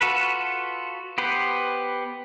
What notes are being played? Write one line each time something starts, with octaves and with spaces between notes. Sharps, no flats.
F4 F#4 A4 B4
B3 G4 B4 C5